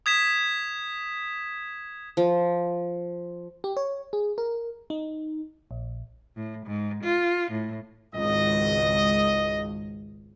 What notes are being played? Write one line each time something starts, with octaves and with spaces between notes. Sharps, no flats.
D#6 G#6 B6 E7
F3
G4
C#5
G#4
A#4
D#4
A#1
A2
G#2
F4
A2
G#1 C#2 D#5